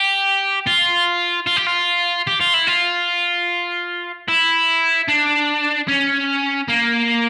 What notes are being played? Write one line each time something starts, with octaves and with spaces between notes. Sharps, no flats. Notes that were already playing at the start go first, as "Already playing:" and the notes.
Already playing: G4
F4
F4
G4
F4
G4
F4
E4
F4
E4
D4
C#4
A#3